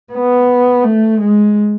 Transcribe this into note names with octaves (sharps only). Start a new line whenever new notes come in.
B3
A3
G#3